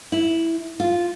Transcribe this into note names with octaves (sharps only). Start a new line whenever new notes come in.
E4
F4